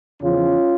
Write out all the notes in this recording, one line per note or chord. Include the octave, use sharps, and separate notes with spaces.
E2 C#3 F3 C#4 F4